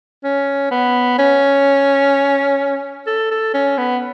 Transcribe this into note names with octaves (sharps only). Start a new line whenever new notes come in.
C#4
B3
C#4
A4
A4
C#4
B3